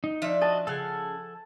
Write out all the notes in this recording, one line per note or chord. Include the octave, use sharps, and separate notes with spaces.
D#4
F3 D4 D5 E5
F#4 D#5 A5
C#3 A4 F5 F#5 G#5